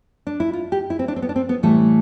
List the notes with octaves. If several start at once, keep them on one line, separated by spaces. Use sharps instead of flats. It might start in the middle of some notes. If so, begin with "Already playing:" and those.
D4
E4
F4
G4
E4
C4
D4
C4
B3
D4
C4
B3
A2 E3 G3 A3